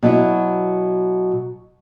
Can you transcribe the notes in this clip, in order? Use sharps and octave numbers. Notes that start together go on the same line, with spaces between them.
B2 F#3 E4